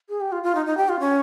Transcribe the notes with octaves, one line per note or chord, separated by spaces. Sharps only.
G#4
G4
F4
F4
D#4
D#4
G4
F4
C#4